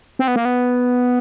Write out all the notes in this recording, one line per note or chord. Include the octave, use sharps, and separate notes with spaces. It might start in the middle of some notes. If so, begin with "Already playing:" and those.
C4
B3
A#3
B3